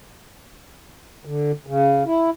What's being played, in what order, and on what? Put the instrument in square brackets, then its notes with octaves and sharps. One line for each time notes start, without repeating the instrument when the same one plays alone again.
[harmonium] D3
C#3
E4